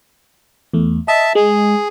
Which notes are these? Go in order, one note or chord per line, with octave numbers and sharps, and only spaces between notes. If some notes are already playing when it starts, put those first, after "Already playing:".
E2 A3
D#5 E5 A5
G#3 G#4